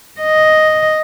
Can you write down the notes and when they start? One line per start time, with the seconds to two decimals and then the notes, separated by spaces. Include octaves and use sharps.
0.21 D#5